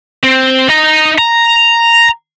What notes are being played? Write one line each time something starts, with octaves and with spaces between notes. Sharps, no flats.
C4
D#4 A#5
A#5